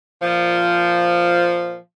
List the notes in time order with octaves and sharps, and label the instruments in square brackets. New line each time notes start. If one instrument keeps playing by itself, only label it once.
[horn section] A#2 F3